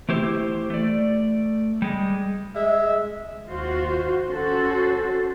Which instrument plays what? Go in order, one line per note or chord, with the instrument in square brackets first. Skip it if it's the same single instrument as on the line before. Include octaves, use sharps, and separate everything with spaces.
[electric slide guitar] E3 A3 E4 G4 C5
A3 D5
G3 G#3
[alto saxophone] G#3 [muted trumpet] E5
[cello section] D#2 F4 F#4 C5
C#4 F#4 A4 C5